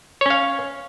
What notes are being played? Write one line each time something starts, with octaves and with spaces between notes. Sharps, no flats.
C#4 C#5 F5